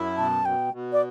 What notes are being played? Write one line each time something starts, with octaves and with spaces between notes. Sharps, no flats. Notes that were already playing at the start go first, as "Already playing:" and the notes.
Already playing: F#2 E4
B2 A5
B2 G5
B2
D5